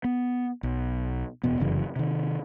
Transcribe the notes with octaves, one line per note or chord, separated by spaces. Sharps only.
B3
B1
D#1 E2 B2 B3
F1 F#2 C#3 E3
C3 D#3